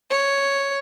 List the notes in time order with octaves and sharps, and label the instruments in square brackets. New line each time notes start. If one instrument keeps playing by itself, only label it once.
[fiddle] C#5